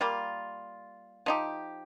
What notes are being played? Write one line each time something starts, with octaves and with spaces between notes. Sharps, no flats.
G3 A#3 F4
F3 D#4 G4